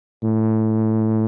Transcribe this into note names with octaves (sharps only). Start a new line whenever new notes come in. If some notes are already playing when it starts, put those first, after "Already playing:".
A2